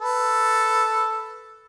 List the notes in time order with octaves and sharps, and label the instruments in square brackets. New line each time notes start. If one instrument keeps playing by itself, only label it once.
[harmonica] A4 B4